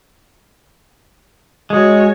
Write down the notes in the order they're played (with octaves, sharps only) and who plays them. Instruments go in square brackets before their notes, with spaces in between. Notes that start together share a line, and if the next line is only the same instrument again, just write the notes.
[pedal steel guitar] G#3 [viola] F#4 C#5